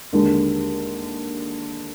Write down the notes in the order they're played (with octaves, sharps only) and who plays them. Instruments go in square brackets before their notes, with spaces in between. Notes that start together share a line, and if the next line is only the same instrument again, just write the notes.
[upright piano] D#2 D3 G#3